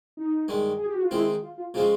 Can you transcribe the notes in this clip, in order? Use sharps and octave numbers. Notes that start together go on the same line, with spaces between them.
D#4
G2 D#3 G#3
G#4
G4
F#4
F4
D#3 G#3 C4 E4
F4
F4
C#3 F3 G#3 C4 F4